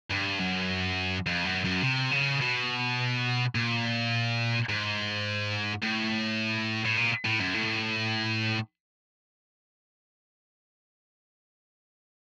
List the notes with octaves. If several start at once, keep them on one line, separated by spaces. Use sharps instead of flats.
G2
F#2
F2
F#2
F#2
C3
C#3
B2
A#2
G#2
A2
A2
A#2
A2
F#2
A2